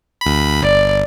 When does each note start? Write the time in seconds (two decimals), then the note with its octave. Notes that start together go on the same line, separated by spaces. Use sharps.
0.21 D2 B5
0.62 G1 D5